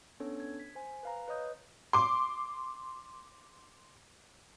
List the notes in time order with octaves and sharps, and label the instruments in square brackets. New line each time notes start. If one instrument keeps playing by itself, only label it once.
[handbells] B3 C#4 D4 A4 C#5
G#6
B6
C5 G#5
B4 F5 A#5
B4 C#5 D#5 D#6 G6
[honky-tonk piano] C6 D6